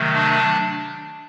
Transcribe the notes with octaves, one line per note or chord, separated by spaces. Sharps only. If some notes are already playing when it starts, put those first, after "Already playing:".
Already playing: C3 D#3 F#3 A3
D4